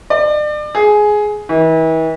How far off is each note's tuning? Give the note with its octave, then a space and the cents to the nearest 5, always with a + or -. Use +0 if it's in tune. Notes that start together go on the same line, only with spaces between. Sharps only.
D5 +35
G#4 +10
E3 -40